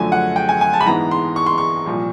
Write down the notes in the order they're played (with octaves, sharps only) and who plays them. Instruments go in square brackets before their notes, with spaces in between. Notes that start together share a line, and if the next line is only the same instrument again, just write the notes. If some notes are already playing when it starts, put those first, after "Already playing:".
Already playing: [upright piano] F#2 D3 F3 A3 G#5
F#5
G5
G#5
G#5
A5
B5
G#2 E3 G#3 B3 A#5
C6
C#6
C6
C#6
C2 A#2 F3